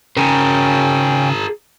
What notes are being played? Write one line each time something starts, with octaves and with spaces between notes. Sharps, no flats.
C#3 C#4 G#4 A#4 G5